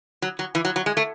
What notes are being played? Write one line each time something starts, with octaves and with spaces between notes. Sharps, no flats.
F#3
F#3
E3
F#3
F#3
G#3
A3